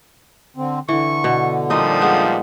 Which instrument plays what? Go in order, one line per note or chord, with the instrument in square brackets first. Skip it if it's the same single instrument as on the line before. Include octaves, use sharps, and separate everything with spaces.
[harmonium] D3 C4
[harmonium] D3 [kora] E3 [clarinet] C#6
[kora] B2
[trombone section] A#2 F3 G3 [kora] C4 D#4 D#5 [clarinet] D#6
[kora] G#3 B3